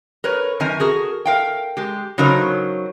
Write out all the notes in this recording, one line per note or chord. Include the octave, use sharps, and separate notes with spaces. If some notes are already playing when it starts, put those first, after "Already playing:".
A#4 B4 C#5
F#2 D#3 C4 A#4 G#5
F#4 G#4 A#4
A#4 F5 G5
G#3 G4
C#3 F#3 D#4 A#4 C5